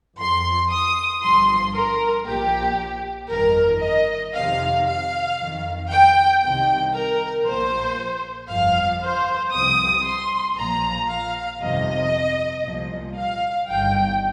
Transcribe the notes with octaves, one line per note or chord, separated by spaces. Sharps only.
F2 F3 C6
D#6
G1 G2 F3 C6
A#4
A#1 A#2 F3 G4
G1 F2 D#3 A#4
D#5
F2 C3 D#3 F5
F5
F2 D#3
G5
C2 C3 D#3 G5
A#4
A#1 A#2 F3 C5
G1 F2 F3 F5
C5
C2 C3 F3 D#6
C6
A#1 A#2 F3 A#5
F5
G1 F2 C3 D#3 D#5
C2 A#2 F3
F5
G1 G2 D#3 G5